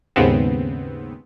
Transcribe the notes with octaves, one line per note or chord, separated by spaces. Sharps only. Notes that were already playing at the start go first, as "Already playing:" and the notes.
D#2 G#2 C#3 B3 C4